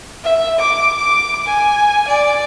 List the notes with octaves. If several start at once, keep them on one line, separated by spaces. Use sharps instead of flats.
E5
D6
D6
G#5
D5